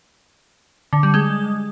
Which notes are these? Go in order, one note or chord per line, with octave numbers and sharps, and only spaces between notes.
D3
G3
G#3